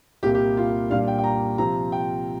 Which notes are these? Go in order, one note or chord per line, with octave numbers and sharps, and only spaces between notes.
C2 A#2 A#3 G4
G4
F4
A#2 G3 D4 F5
G5
G5
A#5
C3 F3 C4 A#5
G5